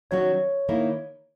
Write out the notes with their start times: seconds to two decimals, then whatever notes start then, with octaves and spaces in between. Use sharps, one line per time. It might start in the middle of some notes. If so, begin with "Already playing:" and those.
0.11 D#3 F#3 C#4 F#4 C#5
0.69 D#3 A#3 E4